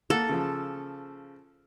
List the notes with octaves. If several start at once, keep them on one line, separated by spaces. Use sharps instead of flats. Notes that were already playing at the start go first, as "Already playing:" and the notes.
A#3 A4 F#5
C#3 F3